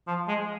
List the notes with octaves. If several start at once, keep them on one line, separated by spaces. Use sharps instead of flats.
F3
G#3